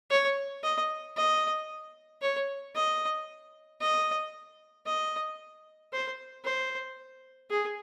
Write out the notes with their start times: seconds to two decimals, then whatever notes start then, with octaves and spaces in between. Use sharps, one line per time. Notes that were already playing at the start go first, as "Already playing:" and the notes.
0.10 C#5
0.63 D#5
1.17 D#5
2.22 C#5
2.75 D#5
3.81 D#5
4.86 D#5
5.93 C5
6.44 C5
7.50 G#4